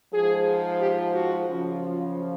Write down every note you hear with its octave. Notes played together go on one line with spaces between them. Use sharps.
G#2 F3 G#4
G4
F#4
F#2 C#3 F3
F4